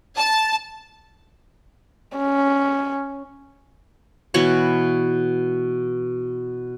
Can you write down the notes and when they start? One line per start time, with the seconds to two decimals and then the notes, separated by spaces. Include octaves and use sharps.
0.17 A5
2.17 C#4
4.34 B2 E3 F#4 C#5